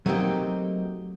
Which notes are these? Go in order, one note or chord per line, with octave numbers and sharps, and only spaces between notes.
F#3 A3 A#3 C4 D#4 G4